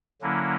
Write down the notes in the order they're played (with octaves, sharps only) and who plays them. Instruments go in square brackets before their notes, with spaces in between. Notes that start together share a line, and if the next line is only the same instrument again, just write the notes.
[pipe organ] D3 F#3 A#3 C#4 E4